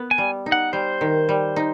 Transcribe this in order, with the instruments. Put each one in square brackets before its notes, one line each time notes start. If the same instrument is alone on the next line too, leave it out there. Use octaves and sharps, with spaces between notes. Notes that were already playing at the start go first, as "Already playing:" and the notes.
Already playing: [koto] B3
[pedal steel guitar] G#5
[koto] G3
D#4
[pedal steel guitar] F#5
[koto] G3 [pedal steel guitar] C5
[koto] D#3
G3
D#4